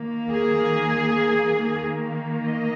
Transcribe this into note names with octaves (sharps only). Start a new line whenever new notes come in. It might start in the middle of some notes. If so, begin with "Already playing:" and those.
Already playing: D#3 A#3
G#4
D#3 A#3
D#5